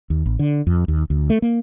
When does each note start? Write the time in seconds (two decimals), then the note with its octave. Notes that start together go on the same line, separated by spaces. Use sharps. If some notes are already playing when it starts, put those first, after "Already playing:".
0.10 D#2
0.26 A1
0.39 D3
0.67 F2
0.88 D#2
1.10 D2
1.30 A3
1.42 A#3